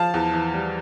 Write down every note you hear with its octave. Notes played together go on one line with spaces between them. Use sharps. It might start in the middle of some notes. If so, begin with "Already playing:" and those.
Already playing: F3 F5 A5
E2
E3
G3